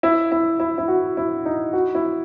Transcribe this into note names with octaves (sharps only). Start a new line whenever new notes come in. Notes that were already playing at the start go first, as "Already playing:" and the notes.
E4
E4
E4
E4
F#4
E4
D#4
F#4
E4